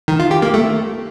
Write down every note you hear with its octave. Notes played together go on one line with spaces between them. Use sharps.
D#3
F4
G4
A#3
A3